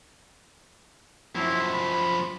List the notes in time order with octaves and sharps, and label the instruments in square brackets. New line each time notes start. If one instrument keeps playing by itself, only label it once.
[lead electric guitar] F#2 F3 [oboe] E4
[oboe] B5